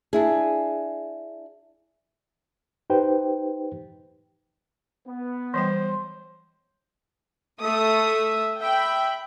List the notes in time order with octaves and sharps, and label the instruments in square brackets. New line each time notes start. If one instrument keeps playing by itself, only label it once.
[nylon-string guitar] D4 E4 G#4
[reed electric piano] D#4 G4 B4 C5 G5
[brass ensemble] B3
[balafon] E3 G3 G5 [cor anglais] C5
[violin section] A3 D#6 [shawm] E5
[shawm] E5 [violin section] G5 B5